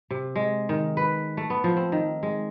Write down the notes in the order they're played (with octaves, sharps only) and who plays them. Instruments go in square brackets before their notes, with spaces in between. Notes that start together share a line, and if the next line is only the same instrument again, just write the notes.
[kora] C3
G#3
D#3
B4
A3
B3
F3
C4
D#3
G#3